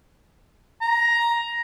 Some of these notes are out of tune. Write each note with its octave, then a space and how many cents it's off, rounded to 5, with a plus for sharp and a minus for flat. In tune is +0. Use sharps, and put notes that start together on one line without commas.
A#5 +10